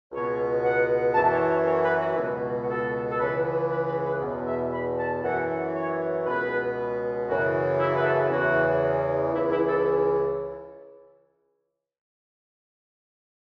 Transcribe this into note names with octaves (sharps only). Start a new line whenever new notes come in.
C#2 B2 C#5
F#5
F#2 E3 A5
C#5
C#5
C#5
B4
F#4
C#2 B2
F#4
A4
A4
C#2 C#3 E3 B4
B4
B4
B4
E2 B2
E5
B5
A5
F#2 E3 F#5
C#5
C#2 B2 B4
F#2 C#3 E3 F#4
E4
B4
A4
E2 C#3 E3 F#4
C#2 C#3 E3 E4
E4
A4